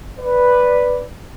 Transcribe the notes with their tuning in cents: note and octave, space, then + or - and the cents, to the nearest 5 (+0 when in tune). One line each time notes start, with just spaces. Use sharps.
B4 +0 D5 +0